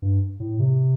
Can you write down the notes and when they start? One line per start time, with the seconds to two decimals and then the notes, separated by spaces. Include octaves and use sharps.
0.02 G2
0.40 A2
0.59 C3